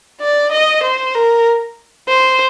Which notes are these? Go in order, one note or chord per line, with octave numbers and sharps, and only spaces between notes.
D5
D#5
C5
A#4
C5